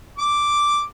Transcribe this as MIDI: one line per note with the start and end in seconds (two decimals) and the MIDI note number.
0.18 0.81 86